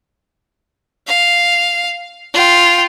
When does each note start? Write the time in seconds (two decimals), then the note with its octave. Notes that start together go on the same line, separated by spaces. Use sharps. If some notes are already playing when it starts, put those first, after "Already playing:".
1.07 F5
2.34 F4 G5